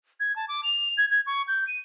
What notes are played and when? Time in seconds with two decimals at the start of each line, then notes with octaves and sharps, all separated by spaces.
0.20 G#6
0.36 A5
0.48 D6
0.63 F7
0.98 G#6
1.10 G#6
1.27 C#6
1.48 G6
1.67 D#7